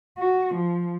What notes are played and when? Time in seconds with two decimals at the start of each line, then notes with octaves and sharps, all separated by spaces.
0.18 F#4
0.55 F3